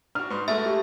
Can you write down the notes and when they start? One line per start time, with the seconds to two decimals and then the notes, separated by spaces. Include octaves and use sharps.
0.15 D4 F#4 F6
0.30 G#2 B4 C6
0.48 G#3 A3 F#4 E5
0.66 G4